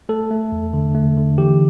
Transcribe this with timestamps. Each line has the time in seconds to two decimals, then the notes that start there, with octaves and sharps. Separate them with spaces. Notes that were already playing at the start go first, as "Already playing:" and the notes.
0.09 A3 A4
0.31 A3
0.52 E2
0.74 D3
0.95 A3
1.17 D3
1.38 E3 G4